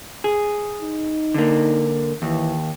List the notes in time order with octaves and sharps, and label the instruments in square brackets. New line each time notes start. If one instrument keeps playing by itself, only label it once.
[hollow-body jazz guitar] G#4
[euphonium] D#4
[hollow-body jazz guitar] D3 A#3
[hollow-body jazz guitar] D#2 [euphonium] E3